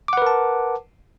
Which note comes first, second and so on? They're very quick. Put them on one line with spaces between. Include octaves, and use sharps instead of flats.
D6 F#5 B4 A#4 A5